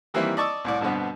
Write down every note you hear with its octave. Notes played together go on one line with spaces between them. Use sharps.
D#3 E3 G3 A#3 C4 E4
D5 D#5 A5 C#6 D6 E6
C2 A2 D5
G2 B2 D3 B3 C4